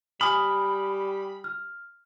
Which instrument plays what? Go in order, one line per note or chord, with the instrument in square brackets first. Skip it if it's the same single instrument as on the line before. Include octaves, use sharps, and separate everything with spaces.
[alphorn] G3 [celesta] G#5 D#6 F6 [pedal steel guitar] B5
[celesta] F6